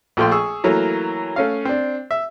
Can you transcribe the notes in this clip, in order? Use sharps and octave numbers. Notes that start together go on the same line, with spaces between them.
A#1 F3 A3 F4 G5 C6
G#4 C#6 E6
E3 F#3 A3 A#3
A3 C#4 F5
C4 D4
E5